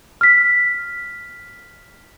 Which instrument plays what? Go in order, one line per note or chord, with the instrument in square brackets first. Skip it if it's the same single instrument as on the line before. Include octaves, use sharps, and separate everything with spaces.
[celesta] F6 B6